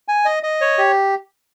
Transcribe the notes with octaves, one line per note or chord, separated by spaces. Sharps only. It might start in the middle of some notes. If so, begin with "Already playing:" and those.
G#5
D#5
D#5
C#5
G4